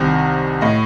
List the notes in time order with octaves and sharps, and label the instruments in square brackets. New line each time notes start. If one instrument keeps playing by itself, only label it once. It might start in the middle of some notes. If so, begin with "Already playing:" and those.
Already playing: [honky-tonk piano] C2 C3 D#3
A2 D#5